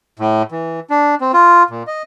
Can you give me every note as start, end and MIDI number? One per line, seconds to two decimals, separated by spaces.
0.19 0.43 45
0.51 0.80 52
0.90 1.15 62
1.21 1.32 60
1.33 1.63 65
1.70 1.83 46
1.87 2.03 75